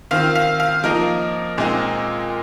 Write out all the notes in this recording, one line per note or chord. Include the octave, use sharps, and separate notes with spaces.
D#3 C4 F4 F5
F5
F5
F3 A#3 D#4 A#4
A#2 G#3 C4 D#4